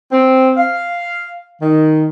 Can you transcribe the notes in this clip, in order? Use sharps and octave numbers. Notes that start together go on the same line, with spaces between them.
C4
F5
D#3